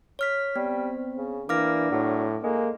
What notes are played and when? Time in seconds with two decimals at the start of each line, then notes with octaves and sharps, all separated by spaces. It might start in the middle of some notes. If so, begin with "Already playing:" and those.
0.19 C#5 F6 B6
0.56 G3 B3 C4
1.17 C#3
1.49 E3 A#3 D4 D6 F6 A#6
1.92 A2 F#3
2.43 G#3 A#3 A4